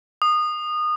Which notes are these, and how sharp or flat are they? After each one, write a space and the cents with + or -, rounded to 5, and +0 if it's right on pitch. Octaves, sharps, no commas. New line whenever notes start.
D#6 -25